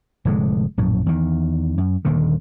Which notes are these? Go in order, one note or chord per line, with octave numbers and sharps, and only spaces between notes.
F1 A2 D3 G#3
A#1 F#2 A2
E2 D#3
F#2
D#1 D#2 D3 D#3